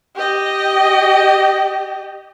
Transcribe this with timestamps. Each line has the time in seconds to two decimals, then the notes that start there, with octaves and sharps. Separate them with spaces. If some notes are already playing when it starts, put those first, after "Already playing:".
0.16 G4 D#5